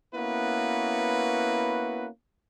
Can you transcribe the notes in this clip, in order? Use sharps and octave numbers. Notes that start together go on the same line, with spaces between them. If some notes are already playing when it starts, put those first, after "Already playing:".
A#3 B3 C#4 E4 F#4 B4